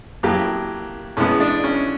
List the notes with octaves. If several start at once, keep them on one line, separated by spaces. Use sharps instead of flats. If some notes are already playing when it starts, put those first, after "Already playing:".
A2 F#3 A#3 G4
A2 E3 G#3 B3 C#4
D4
C#4